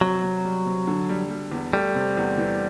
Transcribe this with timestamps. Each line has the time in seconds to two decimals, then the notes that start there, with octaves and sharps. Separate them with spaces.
0.01 C3 F#3
0.23 C3
0.44 G3
0.66 C3
0.87 D3
1.09 G3
1.30 G3
1.52 E2
1.73 G3 A3
1.95 C3
2.17 E2
2.38 E3